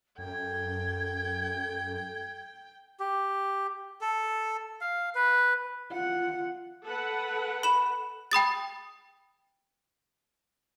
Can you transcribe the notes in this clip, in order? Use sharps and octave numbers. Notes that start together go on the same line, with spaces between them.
F#2 A4 G5 G#6
G4
A4
F5
B4
F4 F#5
A4 B4 F#5
B5 E7
G5 B5 D#6 A6